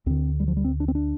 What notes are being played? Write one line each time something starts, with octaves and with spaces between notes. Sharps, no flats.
D2 D3 C4
G3
F3
G3
C4
D4
C4
D4